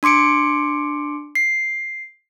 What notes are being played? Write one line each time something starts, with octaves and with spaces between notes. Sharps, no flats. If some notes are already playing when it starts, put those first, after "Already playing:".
D4 C6 D6 C#7 D7
C7